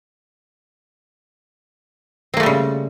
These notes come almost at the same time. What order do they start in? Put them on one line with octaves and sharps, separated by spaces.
C4 A#3 A3 G3 C#3